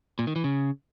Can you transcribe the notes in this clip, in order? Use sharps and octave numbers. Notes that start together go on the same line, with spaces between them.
A#2
D#3
E3
C#3